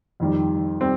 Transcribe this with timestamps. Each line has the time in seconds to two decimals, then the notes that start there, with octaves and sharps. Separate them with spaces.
0.20 F2 D#3 G3
0.81 G3 C4